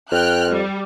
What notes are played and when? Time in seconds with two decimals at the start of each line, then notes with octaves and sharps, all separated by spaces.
0.12 F2 G5 F6 F#6
0.49 G3